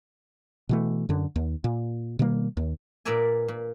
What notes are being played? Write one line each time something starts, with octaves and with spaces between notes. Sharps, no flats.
B2 E3 A3
F#2 D3
D#2
A#2
B2 D#3 G3 A#3
D#2
A#2 A#4 B4 D5 E5 G#5
A#2